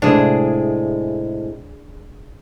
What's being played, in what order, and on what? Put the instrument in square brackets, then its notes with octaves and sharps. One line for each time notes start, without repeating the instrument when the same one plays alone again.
[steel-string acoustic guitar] A2 C3 G#3 [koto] D4 G#4